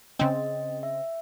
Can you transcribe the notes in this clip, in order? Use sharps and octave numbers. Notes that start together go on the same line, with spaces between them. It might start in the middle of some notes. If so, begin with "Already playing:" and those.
C#3 C4 D#5
E5